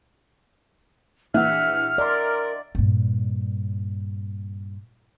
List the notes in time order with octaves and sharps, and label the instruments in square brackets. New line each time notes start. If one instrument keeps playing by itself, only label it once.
[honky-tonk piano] A#1 E3 [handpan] E5 F#5 [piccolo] F6
[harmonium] A#4 [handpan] D5 [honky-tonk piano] D#5 C6
[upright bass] G2 A#2